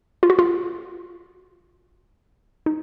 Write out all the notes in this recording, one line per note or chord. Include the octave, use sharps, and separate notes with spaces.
F4
F#4
F4
D#4